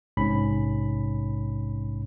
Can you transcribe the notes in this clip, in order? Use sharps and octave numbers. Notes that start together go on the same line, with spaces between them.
A#1 G#2 C3 C#4 B5